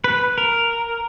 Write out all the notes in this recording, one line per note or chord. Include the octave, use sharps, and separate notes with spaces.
B4
A#4